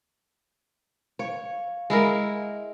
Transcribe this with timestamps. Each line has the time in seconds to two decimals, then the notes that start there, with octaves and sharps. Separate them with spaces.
1.19 C#5 F5
1.90 G#3 E4 A#4